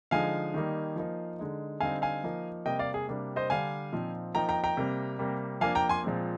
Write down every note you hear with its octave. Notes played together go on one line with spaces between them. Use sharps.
D3 F3 G#3 D#4 F5 G#5
D#3 G3 A#3 D#4
F3 A#3 D#4
D3 G#3 D#4
D3 G3 C4 D#4 F5 G#5
F5 G#5
F3 A#3 D#4
C3 G3 A#3 D#5 G5
D5 F5
G#4
C3 G3 A#3 D4
C5 D#5
D3 G3 D4 F5 G#5
A#2 F3 C4 D#4
F3 A#3 D#4 G5 A#5
G5 A#5
G5 A#5
C3 G3 A#3
C3 G3 A#3
F3 A#3 D4 F5 G#5
G5 A#5
G#5 C6
A#2 F3 G#3 C4